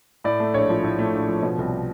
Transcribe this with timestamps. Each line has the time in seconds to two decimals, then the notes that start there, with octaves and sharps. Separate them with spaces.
0.24 A2 D5
0.40 A3
0.54 A#1 C#5
0.70 F3
0.84 A2
0.99 A3
1.14 A#1
1.28 F3
1.43 B2
1.58 C2